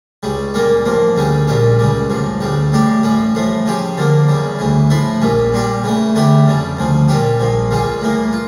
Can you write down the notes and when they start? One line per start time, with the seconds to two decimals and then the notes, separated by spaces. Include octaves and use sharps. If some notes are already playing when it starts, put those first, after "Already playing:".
0.23 C#2 C#3 G3
0.54 A#2 G3 A#3 C#4
0.85 A1 G2 F3 A#3
1.16 D2 C#3 G3 C#4
1.47 A#1 A#2 G3 C#4
1.79 C#2 C#3 G3
2.10 A1 G2 F3
2.41 D2 C#3 G3
2.72 A1 A2 G3 D4 G4
3.03 A1 A2 G3 C#4
3.35 A1 A2 F3 A3
3.66 C#3 F3 C#4 G4
3.97 G2 D3 F3 A#3
4.28 E2 C#3 G3
4.59 D2 C#3 E3
4.90 A2 F3 A3 E4
5.22 A#1 A#2 G3 C#4
5.52 A#2 G3 D4 G4
5.83 C#3 E3 A3
6.15 E2 D3 A3 E4 G4
6.46 F2 C#3 G3
6.77 D2 C#3 F3
7.08 A#2 G3 C#4 G4
7.40 A#1 A#2 F3
7.71 C#2 C#3 G3 C#4 F4
8.02 A2 E3 A#3
8.33 F4